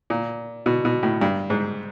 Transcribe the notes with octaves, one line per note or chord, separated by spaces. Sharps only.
A#2
B2
B2
A2
G2
G#2